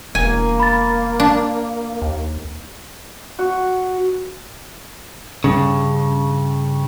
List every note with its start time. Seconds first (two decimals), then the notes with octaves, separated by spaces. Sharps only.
0.15 E1 A#3 G#5
0.60 B5 A6
1.20 D4
2.02 D#2
3.39 F#4
5.44 G2 C#3